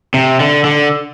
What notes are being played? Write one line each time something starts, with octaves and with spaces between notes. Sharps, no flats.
C3
D3
D3